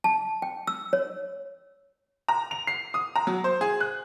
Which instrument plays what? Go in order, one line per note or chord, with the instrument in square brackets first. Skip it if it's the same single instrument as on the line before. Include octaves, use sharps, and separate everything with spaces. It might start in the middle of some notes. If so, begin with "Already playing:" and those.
[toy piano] A5
G5
E6
C#5
[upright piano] A#5
F7
C7
D#6
A#5
F#3
C5
G#4
F#6